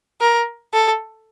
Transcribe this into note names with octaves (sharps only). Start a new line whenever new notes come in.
A#4
A4